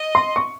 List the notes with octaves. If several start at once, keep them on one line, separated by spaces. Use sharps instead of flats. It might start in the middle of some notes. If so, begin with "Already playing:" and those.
Already playing: D#5
C6
C#6